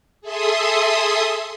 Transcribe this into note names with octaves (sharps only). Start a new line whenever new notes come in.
G#4 A4 E5 C6 D#6